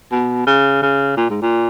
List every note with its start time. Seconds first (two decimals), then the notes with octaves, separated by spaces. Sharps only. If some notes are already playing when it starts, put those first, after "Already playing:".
0.12 B2
0.47 C#3
0.83 C#3
1.17 A#2
1.30 G#2
1.42 A#2